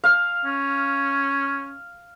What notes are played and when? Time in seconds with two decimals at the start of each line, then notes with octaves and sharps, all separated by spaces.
0.04 F5
0.45 C#4